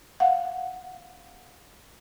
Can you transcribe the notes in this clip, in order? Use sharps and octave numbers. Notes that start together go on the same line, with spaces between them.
F5 F#5